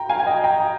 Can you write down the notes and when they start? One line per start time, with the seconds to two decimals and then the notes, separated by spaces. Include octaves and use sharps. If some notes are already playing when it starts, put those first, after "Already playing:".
Already playing: G5 A#5
0.10 F5 G#5
0.20 G#5
0.27 D#5 G5
0.44 G5 A#5